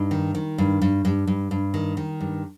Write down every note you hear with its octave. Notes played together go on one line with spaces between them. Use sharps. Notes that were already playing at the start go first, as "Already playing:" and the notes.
Already playing: G2 D#4
D#3
D#3
G2
G2
G2
G2
G2
D#3
D#3
G2